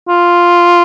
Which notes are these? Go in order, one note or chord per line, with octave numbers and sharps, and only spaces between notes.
F4